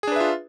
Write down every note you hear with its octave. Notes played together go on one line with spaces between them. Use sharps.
D4 F4 G#4 B4 E5